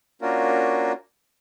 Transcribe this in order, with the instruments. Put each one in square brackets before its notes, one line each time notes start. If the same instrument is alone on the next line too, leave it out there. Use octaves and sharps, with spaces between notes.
[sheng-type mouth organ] A#3 C#4 D4 F4 F#4 A#4